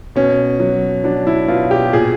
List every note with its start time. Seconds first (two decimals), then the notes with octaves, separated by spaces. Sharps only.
0.16 B2 C#4
0.60 F#3
1.04 F#3 D4
1.27 E4
1.48 B2 F4
1.71 G4
1.93 A#2 G#4